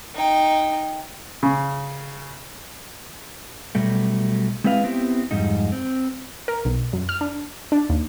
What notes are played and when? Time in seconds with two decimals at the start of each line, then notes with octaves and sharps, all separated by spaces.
0.15 D#4 G5
1.43 C#3
3.75 B2 F#3 G3 A3
4.64 G#3 C4 E4 B4 F5
4.84 B3 C4 E4 G4
5.31 F2 G#2 G3 D#4
5.72 C4
6.48 A#4
6.65 B1
6.93 F#2
7.09 F6
7.21 D4
7.72 D4
7.90 D#2